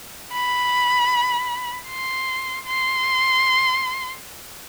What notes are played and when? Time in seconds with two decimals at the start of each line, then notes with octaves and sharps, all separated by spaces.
0.33 B5
1.89 C6
2.67 C6